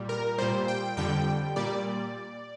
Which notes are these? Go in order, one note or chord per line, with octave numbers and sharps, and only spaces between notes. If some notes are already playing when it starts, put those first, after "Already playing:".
Already playing: A#2 G3
A#4
A#2 G3 C5
G5
F2 D3 G3 G5
A#2 G3 D5